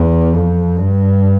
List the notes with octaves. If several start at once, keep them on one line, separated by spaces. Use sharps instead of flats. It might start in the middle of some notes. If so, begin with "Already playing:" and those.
Already playing: E2
F2
G2